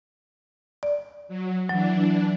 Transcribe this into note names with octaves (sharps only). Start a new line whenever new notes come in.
D5
F#3
E3 F#3 D4